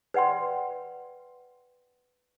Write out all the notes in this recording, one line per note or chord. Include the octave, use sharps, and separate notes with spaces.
B4 D5 F#5 G5 C6